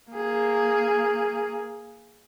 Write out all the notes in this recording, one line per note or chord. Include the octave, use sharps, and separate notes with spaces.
A#3 G#4